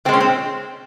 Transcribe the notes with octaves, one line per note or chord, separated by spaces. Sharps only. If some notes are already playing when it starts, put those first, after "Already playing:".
A#2 G#3 C4 C#4
C4